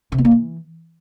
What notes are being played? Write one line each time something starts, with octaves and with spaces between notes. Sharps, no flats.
C3
B3
A#3
E3